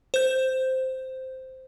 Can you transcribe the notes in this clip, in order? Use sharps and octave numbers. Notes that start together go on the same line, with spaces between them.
C5 G6